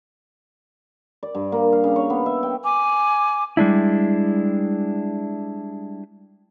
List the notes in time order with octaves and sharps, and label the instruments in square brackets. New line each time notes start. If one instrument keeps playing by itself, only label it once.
[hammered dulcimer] D5
G2
A#3
F5
C#3
C#5
B3
E5
G5
[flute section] G#5 D6
[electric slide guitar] G3 G#3 D4 E4